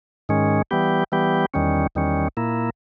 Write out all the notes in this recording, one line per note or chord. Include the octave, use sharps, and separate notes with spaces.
G#2 D#3 G#3 C#4
E3 G3 B3 G4
E3 G3 B3 G4
E2 D#3 G3 C#4
E2 D#3 G3 C#4
A#2 A#3 E4